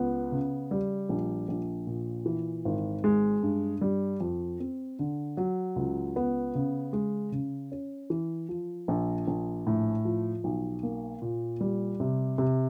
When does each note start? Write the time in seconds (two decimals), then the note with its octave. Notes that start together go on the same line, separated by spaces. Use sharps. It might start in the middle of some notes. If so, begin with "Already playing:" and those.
Already playing: C#2 B3
0.32 C#3
0.71 G3
1.09 A#1
1.48 A#1
1.87 A#2
2.26 E3
2.65 G#1
3.04 G#3
3.43 G2
3.81 G3
4.20 F2
4.60 C4
4.99 D3
5.37 F#3
5.76 C#2
6.16 B3
6.55 C#3
6.93 G#3
7.32 C#3
7.72 C#4
8.10 E3
8.49 F3
8.88 A#1
9.28 A#1
9.67 A2
10.05 F3
10.44 B1
10.83 A#3
11.22 A#2
11.61 G3
12.00 C3
12.38 C3